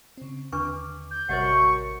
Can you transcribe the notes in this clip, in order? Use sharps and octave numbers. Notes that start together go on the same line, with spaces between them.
C#3 C4
D#2 D3 D4 B4 C#6 D6
G6
A1 F#2 C3 G3 C5 D#5 F#5 C#6